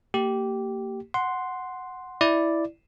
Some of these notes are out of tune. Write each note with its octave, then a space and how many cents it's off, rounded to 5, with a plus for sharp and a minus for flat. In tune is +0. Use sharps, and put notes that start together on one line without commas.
A#3 -30 G4 -15
F#5 +0 C6 +0
E4 +0 D5 +0